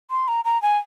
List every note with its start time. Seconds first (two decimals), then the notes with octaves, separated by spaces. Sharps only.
0.11 C6
0.28 A#5
0.45 A#5
0.62 G#5